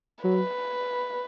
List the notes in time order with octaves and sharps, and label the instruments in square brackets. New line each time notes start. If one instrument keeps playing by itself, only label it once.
[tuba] F#3 [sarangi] B4